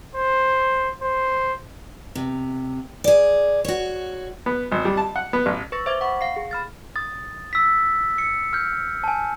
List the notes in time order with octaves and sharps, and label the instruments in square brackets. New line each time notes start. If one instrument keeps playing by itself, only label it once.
[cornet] C5
C5
[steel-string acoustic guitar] C3
G#4 D5
F#4 C#5
[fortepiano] B3
G#1
G3
A5
F#5
B3
A1
[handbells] B4 C#6 E6 A6 A#6
C5 E5 D6 G#6
F#5 B5 C#6
F5 C7
G#4
B5 F6 A6
[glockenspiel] D#6 A6
E6 B6
C#7
F6 G6
G#5 A5